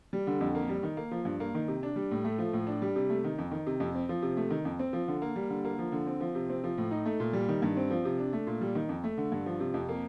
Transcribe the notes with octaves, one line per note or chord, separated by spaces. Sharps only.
G3
D3
F2
A#3
G3
D#3
A#3
F3
G2
A#3
D#3
C3
D4
G3
A2
A3
F3
A2
D4
G3
C3
A3
D#3
F2
D#3
C3
F2
C4
F3
C3
A3
D#3
F2
C4
F3
D3
A#3
G3
D3
A#3
F3
D3
C4
F3
C3
C4
F3
A2
D#4
A3
A#2
G3
D#3
G2
C4
F3
C3
D4
A3
A#2
G3
D#3
F2
A3
D3
G2
F3
C3
F2
A#3